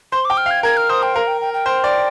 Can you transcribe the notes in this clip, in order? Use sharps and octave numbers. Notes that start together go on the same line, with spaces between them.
C5 C6
G5 D6
F6
F5
G#6
A#4 G#6
F6
C5 D#6
G5
A#4 F5
G5
G5
G5
C5
D5